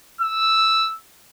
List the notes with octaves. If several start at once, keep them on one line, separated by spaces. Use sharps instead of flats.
E6